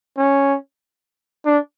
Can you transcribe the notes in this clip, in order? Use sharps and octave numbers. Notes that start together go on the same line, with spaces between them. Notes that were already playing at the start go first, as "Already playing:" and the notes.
C#4
D4